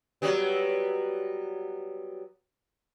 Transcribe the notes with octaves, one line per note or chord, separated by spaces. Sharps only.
F#3 G3 B3